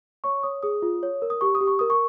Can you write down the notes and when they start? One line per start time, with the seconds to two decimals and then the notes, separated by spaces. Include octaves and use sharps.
0.24 C#5 C#6
0.43 C#5 D#6
0.63 G#4 D#6
0.82 F4
1.03 C#5
1.22 A#4
1.30 D#6
1.41 G4 C#6
1.55 D#6
1.61 G4
1.67 C#6
1.79 A#4 D#6
1.90 C#6